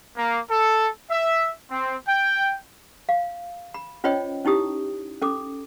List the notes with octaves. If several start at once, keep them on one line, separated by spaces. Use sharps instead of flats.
A#3
A4
E5
C4
G5
F5
B5
C#4 F4 C5 C#5 D#5 G5
C#4 D#4 E4 G4 D#6
C#4 A4 D6